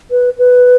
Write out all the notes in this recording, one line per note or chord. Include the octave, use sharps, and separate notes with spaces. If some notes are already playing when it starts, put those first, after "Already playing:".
B4
B4